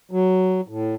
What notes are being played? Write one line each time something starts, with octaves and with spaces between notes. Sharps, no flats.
F#3
A2